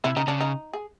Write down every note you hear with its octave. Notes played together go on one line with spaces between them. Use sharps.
C3 E4
C#3 D#4
C#3 D4
D#4
G#4